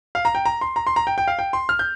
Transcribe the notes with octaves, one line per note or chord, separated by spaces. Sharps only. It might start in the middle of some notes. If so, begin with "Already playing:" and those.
F5
A#5
G5
A#5
C6
A#5
C6
A#5
G5
G5
F5
G5
C6
F6
G6